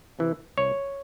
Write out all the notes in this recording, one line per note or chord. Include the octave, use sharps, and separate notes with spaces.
C3 E3
C2 C#5